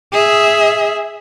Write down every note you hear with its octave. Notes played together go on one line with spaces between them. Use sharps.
G#4 E5